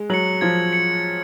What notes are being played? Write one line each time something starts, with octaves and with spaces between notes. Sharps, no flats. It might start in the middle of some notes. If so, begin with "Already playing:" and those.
Already playing: G#3
F#3 C#7 F#7
F3 G#6
C#7 F#7
G#6